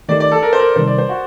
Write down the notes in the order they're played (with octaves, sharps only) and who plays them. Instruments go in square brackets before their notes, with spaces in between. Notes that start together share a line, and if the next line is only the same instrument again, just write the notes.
[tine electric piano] D#3 A3 D#4 G4 [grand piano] D5
[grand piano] D5
A4
A#4
C5
A#4
[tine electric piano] C3 D#3 G3 [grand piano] C5
[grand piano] D5
C5
F#4